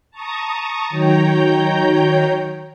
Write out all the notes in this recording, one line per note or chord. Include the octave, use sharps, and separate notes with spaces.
A5 A#5 C#6 D#6
D#3 F#3 C#5 G5 A#5 G6